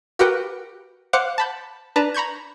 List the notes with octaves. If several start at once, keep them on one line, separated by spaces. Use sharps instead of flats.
F#4 G4 A#4 B4 F#5 G5
C5 F5 F#5 D6 F#6 C#7
A5 B5 G6
D4 B4 A5 A#5
A#5 B5 C#6 G6 G#6